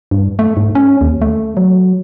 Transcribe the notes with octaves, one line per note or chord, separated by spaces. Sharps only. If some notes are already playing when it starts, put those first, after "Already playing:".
G2
A3
G#2
C#4
D#2
A3
F#3